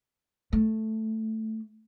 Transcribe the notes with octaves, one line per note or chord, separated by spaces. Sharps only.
A3